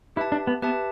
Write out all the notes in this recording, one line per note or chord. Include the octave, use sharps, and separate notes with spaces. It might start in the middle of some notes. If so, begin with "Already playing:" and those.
E4 G4 B4 E5 A5
D4
B3
B3 G4 B4 E5 A5